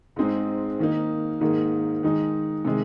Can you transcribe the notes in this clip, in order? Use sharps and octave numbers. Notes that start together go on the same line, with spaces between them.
G#2 G#3 C4 D#4
D#3 A#3 D#4
G#2 D#3 A#3 D#4
D#3 G#3 D#4
C3 D#3 G#3